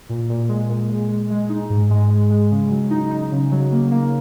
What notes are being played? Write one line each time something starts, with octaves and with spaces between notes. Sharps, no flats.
A#2
A#2
G#3
A#2
G#3
G#3
G#3
D#4
G#2
G#3
G#3
G#3
C#3
F#3
D#4
D#4
C#3
F#3
A#3
A#3